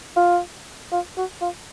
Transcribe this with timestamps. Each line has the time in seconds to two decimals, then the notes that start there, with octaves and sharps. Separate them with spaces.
0.16 F4
0.92 F4
1.17 F#4
1.41 F4